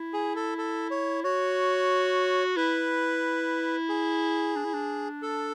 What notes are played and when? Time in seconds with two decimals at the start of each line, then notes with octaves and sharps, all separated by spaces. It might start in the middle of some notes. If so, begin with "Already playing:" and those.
Already playing: E4
0.13 G#4
0.36 A4
0.58 A4
0.91 C#5
1.24 F#4 C#5
2.56 E4 B4
3.89 G#4
4.56 D4
4.64 E4
4.74 D4
5.22 A4